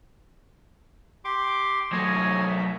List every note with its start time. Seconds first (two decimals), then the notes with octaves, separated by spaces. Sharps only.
1.25 G4 C6 D6
1.92 F#2 A3 C#5 D#5 G#5
2.48 E5